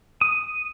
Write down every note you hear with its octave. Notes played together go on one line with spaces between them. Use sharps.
D#6